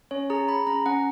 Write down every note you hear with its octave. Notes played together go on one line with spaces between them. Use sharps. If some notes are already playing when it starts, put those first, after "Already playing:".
C#4 C#5
G#4 A#5
G#4 B5
C#4 A#5
C#4 F#5